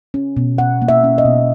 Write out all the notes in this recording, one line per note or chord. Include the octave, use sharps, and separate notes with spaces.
C#4
B2
B2 F#5
A#3
E5
C#4
D#5
B2